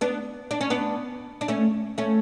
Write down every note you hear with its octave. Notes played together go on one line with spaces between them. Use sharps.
B3 D4
D4
C#4
B3 D4
D4
A3 C#4
A3 C#4